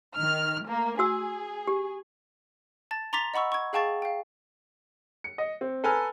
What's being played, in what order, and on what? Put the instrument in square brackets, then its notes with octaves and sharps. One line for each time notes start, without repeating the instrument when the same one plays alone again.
[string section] D#3 F6
A3 A#3
[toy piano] F#4 E6 [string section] G#4
[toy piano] G4
[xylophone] A5 A6
A#5 C6 D6 A6 B6 F7
D#5 F#5 B5 C#6 E6
C#6 G#6
G#4 F5 G5 A5 C#6 A6
F5 G5
[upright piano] C#7
D#5
C4
A4 B4 G#5 A#5 F6